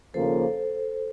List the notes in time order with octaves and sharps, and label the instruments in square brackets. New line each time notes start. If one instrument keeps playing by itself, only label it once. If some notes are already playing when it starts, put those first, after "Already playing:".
[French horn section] D#2 C#3 F3 A#3 [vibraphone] A4 C5